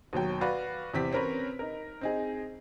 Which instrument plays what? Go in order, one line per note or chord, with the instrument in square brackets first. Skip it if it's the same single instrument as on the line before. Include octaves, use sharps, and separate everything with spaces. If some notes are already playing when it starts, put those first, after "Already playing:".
[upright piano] D#2 B2 F#3 G5
F#4 B4 D5 F5
E2 C3 C4 G4 B6
C4 C#4 A#4 B4 C#5
D#4 A#4
C4 D#4 G#4